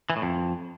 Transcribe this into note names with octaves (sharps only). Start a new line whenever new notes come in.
E3
A2
F2